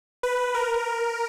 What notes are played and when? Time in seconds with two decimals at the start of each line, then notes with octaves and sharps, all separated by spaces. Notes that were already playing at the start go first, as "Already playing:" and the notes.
0.23 B4
0.55 A#4